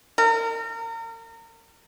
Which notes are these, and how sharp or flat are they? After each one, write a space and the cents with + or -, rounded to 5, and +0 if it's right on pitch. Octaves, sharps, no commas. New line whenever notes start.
A#4 -35